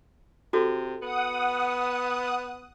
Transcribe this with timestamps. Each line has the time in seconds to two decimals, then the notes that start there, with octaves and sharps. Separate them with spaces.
0.53 C3 F#4 A4
1.02 B3 F#5 D#6